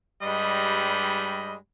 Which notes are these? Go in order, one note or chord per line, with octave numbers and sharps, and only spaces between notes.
G2 G3 G#3 D#5 B5